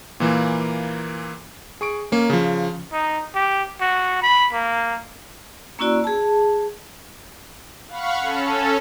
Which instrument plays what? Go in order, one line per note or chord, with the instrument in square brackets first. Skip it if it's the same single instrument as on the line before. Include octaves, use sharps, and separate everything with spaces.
[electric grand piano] A#2 E3 A#3
G#4 C#6 D7
A#3 C#4
C#3 F3
[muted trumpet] D#4
G4
F#4
B5
A#3
[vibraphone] A#3 C#4 E4 F#4 D5 E6
G#4 A5
[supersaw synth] F5 F#5 B5 C#6
C#4 A4